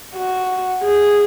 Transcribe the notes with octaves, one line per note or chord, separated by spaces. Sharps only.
F#4
G#4